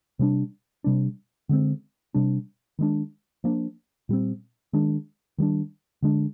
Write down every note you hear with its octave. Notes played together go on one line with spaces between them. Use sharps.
C3 G3 A#3 D4
C3 G3 D4
D3 G#3 C4
C3 G3 D4
D#3 G#3 D4
F3 A#3 D4
A#2 G3 C4
D#3 G#3 D4
D#3 G3 D4
D3 G#3 D4